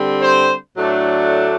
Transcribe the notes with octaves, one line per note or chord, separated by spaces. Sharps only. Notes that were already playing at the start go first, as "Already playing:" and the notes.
Already playing: D3 G3 C4
C5
A2 F#3 A3 D4